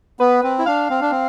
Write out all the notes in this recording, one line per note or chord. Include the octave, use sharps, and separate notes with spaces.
B3 B4
C4
E4
D4 F5
C4
D4
C4